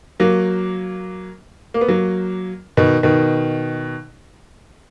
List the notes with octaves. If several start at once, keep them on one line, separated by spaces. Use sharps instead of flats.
F#3 A#3
A#3
B3
F#3 A#3
B2 D#3
B2 D#3